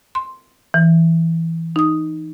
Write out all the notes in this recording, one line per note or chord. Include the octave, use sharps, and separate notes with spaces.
C6
E3
D#4 D#6